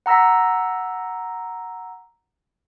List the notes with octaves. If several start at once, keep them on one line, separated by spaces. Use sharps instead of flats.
F#5 A#5 E6 A#6 B6